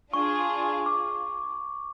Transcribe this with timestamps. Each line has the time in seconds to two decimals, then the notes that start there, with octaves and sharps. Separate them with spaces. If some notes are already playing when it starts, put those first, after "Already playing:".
0.13 D4 F4 G#4 C#6
0.86 D6